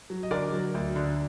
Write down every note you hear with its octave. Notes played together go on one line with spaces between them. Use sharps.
F#3
D#5
D3 A#4 D5
F#3
D2
D3